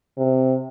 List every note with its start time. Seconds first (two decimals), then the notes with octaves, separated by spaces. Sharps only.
0.17 C3